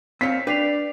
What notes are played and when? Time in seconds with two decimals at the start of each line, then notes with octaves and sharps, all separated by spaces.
0.21 C4 C#5 F5 B6
0.47 D4 B4 D5 C7 F7